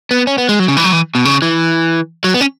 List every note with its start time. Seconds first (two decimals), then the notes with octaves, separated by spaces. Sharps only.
0.11 B3
0.27 C#4
0.38 B3
0.49 G#3
0.59 F#3
0.68 C#3
0.77 E3
0.84 F#3
0.92 E3
1.15 B2
1.25 C#3
1.42 E3
2.24 F#3
2.34 B3
2.41 C#4